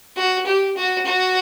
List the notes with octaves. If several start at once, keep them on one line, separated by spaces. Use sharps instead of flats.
F#4
G4
F#4
F#4